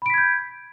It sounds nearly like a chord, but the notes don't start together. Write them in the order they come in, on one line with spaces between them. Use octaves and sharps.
B5 D7 B6 G#6 G6